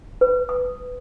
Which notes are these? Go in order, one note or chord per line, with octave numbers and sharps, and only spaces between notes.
B4
D#6